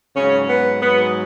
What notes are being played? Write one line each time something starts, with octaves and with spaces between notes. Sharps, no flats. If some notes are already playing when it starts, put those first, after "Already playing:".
G#2 C#3 F#3 C#4
B3
G#2 F#3 B3